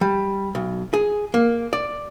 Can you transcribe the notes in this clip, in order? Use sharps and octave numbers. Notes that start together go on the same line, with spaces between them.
G3
B1
G#4
A#3
D5